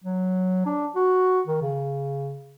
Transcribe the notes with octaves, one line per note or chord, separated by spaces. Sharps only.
F#3
D4
F#4
D#3
C#3